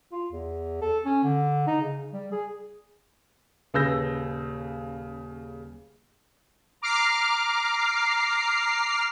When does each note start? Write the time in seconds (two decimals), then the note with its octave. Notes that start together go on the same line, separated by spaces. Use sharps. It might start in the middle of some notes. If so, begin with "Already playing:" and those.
0.12 F4
0.32 E2
0.81 A4
1.05 C#4
1.24 D3
1.67 D#4
1.80 C#3
2.13 G3
2.32 G#4
3.74 D#1 C#3 B4 E6 G6 A#6
6.82 A#5 D6 F6 C7